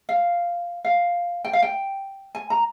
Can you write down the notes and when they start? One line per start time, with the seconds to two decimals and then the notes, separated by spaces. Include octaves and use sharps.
0.09 F5
0.85 F5
1.45 G5
1.53 F5
1.62 G5
2.35 G#5
2.50 A#5